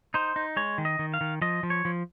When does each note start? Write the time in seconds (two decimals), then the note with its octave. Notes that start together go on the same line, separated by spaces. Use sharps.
0.14 D#4 C5
0.36 D#4
0.57 G#3 C#5
0.78 D#3
0.85 D#5
0.99 D#3
1.14 F5
1.21 D#3
1.42 F3 D#5
1.63 F3
1.70 C#5
1.85 F3